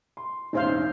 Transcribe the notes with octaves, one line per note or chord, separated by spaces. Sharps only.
C6
E1 A1 C4 C#4 D#4 C5 F5